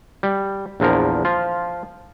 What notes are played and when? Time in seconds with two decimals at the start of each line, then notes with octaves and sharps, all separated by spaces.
0.23 G3
0.80 A#1 E2 F3 A#4
1.25 F3 F4